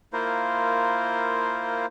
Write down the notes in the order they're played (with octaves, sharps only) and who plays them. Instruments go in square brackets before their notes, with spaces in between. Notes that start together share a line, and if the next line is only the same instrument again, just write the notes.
[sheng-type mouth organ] A#3 E4 F4 A#4 C5